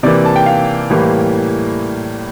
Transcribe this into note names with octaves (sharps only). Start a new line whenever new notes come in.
C3 E3 A#3 D5
A5
G5
F5
A2 E3 G3 A#3